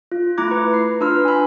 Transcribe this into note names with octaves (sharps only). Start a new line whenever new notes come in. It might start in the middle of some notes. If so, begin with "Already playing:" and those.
F4
A3 E4 A#5 D6 F#6 G#6
B4
C7
D4 F4 B4 C6 E6 F6
G#5 B5